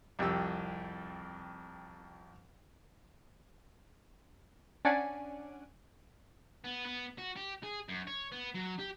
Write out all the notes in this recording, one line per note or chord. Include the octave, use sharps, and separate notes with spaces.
C2 F2 G4 E6
C#4 D4 D5 F#5 G#5
B3
B3
F#4
G4
G#4
F#2
C#5
B3
F#3
G4